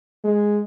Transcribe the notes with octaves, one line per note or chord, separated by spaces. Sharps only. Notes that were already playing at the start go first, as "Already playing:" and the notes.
G#3